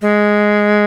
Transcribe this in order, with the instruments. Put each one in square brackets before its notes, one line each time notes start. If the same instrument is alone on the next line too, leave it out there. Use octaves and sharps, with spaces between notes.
[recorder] G#3